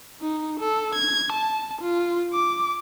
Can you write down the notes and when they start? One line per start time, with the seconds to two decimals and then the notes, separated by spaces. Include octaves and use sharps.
0.21 D#4
0.60 A4
0.95 G#6
1.32 A5
1.81 F4
2.33 D6